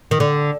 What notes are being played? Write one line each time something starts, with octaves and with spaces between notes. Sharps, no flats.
D#3
D3